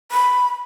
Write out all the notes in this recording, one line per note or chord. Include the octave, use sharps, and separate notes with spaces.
B5